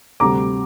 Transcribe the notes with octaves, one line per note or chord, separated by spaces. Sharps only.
D2 C3 G3 A#5 D6